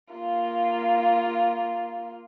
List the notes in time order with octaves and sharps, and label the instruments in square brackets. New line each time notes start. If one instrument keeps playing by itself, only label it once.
[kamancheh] A#3 F4